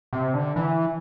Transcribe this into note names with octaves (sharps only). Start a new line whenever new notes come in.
C3
D3
E3